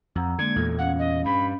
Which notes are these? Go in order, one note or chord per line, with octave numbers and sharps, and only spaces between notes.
F2 F#5 A#5 E6
D3 G#3 A#3 G#6
E2 A#2 A4
C#4 F5 F#5
D#5
G2 B5